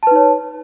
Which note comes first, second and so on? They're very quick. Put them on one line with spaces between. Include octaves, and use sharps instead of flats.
A5 B4 D#4 C#5